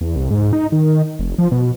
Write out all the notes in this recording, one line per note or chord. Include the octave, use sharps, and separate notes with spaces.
E2
C2
G#2
D#4
D#3
F1
F3
B2